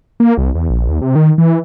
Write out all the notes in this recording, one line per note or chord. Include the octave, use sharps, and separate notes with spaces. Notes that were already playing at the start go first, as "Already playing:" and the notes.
A#3
C2
E2
A#1
D#2
C3
D#3
E3